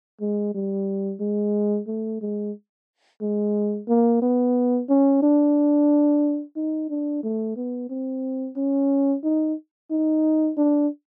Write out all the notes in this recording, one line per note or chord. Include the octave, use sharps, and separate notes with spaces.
G#3
G3
G#3
A3
G#3
G#3
A#3
B3
C#4
D4
D#4
D4
A3
B3
C4
C#4
D#4
D#4
D4